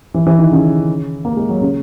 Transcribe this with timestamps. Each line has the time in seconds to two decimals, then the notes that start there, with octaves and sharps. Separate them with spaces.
0.14 E3
0.27 E3
0.39 D#3
0.52 C#3
1.25 A#3
1.37 G#3
1.49 F#3
1.62 C#3